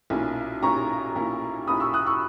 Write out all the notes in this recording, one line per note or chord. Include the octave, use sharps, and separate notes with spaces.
B1 A#2 A#3 C#4 E4
B1 A#2 A#3 C#4 E4 A#5 C#6
B1 A#2 A#3 C#4 E4
B1 A#2 A#3 C#4 E4 B5 D#6
C#6 E6
D#6 F#6
C#6 E6